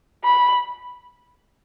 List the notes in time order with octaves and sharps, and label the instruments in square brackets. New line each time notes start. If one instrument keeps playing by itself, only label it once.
[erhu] B5